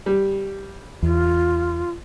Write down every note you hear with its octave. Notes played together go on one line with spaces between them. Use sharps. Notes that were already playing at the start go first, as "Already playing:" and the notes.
G3
E2 F4